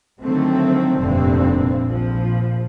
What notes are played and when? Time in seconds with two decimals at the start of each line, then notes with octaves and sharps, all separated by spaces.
0.23 D3 D#3 F3 F#3 A3 C4
1.00 F1 G2 A#2 D3 C4
1.86 A#1 F3